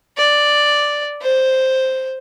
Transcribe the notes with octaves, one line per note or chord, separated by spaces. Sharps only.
D5
C5